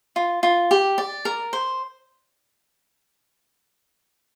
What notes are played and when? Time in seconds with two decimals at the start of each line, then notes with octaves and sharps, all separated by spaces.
0.16 F4
0.43 F4
0.71 G4
0.98 D5
1.25 A#4
1.53 C5